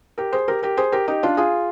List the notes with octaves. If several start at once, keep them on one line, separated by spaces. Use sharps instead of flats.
G4 A#4
G#4 C5
G4 A#4
G4 A#4
G#4 C5
G4 A#4
D#4 G4
D4 F4
F4 G#4